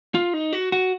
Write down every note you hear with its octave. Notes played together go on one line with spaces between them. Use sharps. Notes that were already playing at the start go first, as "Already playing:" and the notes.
F4
D#4
F#4
F#4